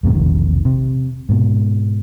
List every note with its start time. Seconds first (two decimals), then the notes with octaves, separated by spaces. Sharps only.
0.03 F2 A2 C3
0.15 E1 A#1 C3 D#3
0.65 C3
1.29 G#2 B2